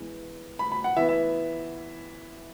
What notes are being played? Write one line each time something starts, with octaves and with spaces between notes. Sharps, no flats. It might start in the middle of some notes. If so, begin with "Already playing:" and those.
Already playing: E3 G#3 B3
B5
B5
F#5
E3 B3 E5
E5